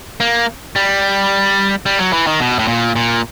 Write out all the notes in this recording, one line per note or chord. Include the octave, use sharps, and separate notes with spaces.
A#3
G3
G3
F#3
E3
D#3
B2
A2
A#2
A#2